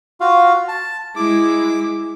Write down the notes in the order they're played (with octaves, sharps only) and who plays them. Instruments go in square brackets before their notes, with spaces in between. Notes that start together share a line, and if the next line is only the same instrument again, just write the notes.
[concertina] F4 F#4 F5
A5
[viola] G#3 E4 [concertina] D6